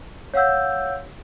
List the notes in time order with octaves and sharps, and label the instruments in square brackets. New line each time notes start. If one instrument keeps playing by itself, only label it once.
[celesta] C#5 F5 F#5 E6 G6